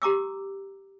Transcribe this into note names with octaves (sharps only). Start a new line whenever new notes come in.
G4 A#5 D6 E6